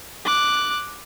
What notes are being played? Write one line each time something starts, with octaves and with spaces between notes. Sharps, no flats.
D6 F#6